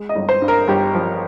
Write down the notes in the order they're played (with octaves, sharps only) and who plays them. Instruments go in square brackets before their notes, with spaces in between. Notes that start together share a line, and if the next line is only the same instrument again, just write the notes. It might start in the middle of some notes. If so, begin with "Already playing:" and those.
Already playing: [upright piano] G#3
D#5
G1
C5
G2
A#4
G1 G4
F3